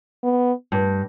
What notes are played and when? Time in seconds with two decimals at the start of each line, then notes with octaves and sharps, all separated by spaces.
0.23 B3
0.72 G2